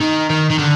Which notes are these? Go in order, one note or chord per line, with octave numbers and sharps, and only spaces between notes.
D#3
D#3
D#3
D3